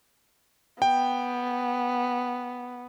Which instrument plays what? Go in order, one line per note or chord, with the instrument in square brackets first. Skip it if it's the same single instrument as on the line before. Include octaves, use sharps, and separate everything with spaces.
[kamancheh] B3 [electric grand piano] G5